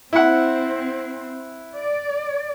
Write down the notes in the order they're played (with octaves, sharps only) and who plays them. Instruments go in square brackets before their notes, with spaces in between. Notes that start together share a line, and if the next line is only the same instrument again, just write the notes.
[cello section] C4 [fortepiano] E4 F#5
[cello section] D5